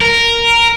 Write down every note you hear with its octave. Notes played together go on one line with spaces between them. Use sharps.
A#4